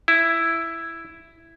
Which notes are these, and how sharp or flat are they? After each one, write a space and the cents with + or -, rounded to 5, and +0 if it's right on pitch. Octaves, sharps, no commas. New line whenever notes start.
E4 +5